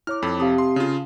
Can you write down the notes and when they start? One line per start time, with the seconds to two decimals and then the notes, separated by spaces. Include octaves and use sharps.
0.07 E4 C#5 D6 F6
0.23 F2 A4 B5
0.40 C3 F5 A5 D#6
0.58 C6
0.76 C#3 F4